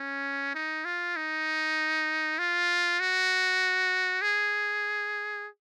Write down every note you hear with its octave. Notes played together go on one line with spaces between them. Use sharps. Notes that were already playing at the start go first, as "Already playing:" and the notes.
Already playing: C#4
D#4
F4
D#4
F4
F#4
G#4